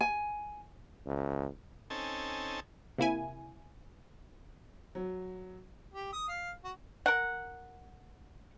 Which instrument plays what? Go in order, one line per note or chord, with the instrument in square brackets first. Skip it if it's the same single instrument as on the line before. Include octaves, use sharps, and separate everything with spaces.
[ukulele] G#5
[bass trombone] C#2
[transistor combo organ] C4 C#4 D#4 A4 G#5 A5
[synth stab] C3 A#3 E4 G#5
[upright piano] F#3
[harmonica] G4
D#6
F5
F#4
[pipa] A#4 F#5